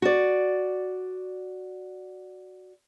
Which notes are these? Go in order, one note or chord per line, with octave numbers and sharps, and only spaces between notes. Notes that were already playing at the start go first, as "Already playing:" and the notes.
F#4 D5